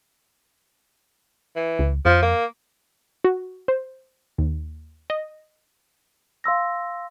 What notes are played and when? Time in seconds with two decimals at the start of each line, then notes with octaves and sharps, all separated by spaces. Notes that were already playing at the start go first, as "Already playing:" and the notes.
1.56 E3
1.79 C#2
2.05 F2 F3
2.22 A#3
3.24 F#4
3.68 C5
4.38 D#2
5.10 D#5
6.44 F5 C6 E6 A#6